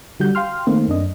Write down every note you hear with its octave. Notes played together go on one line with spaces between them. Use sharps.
D3 G3 F#4 F#5 G6
F5 G5 C6 F6
D#3 A3 A#3 C4 D#4
F#2 D4 D#5